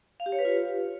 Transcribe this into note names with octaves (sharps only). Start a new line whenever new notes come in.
F5
G4
C#5
B4
F4